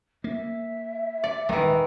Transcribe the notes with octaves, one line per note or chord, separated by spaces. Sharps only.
A#3 E5
D5
D#1 G#1 D#3 E3 G#3